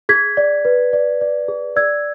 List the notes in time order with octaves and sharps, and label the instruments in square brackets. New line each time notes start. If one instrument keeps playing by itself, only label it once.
[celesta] G#4 G#6 B6
D5
B4
D5
D5
G#4
D5 E6 G#6